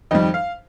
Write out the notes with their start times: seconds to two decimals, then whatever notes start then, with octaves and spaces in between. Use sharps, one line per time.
0.11 F2 D#3 G3 D#5
0.34 F5